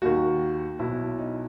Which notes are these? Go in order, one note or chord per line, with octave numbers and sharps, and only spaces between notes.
D#2 D#3 F#4
B1 B2 E4
D#4